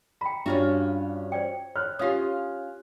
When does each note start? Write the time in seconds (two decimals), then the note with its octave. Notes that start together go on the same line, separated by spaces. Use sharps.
0.21 G5 A#5 B5
0.46 G2 C#4 F4 F#4
1.32 C5 D5 G5
1.76 C#5 F6 F#6
1.99 C#4 F4 G4 F5 D#6